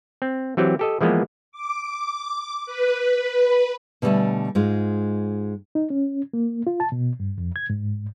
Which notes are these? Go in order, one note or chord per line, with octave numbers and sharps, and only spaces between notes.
C4
E3 F#3 C4 G4
G4 A4 D#5
E3 F3 G#3 A#3 B3
D6
B4
B2 D3 G3 A3 D5 G#5
G#2 G#3 F4
D#4
C#4
A#3
F4
A5
B2
G2
F2
G#6
G#2